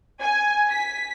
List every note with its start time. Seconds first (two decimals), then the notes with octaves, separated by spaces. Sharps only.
0.21 G#5
0.70 B6